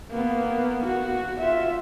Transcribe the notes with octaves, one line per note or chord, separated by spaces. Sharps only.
A#3 B3
F#4
F4 E5